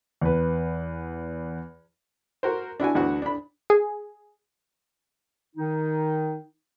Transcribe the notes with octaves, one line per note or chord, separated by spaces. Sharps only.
E2 B4
F#4 A#4 C5
D4 E4 F#4 G#5
D2 E3 D4 F#4 F#5 F#6
D4 B5
G#4
D#3 D#4